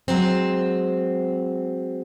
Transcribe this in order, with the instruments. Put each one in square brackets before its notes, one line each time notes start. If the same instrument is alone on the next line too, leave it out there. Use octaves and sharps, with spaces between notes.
[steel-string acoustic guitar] F#3 G#3 C4